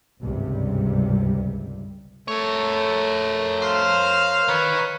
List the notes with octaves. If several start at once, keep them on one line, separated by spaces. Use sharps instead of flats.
G#1 C#2 G2 C3 G3
A3 A#4 C#5
C5 F5
D#3 B4 C#5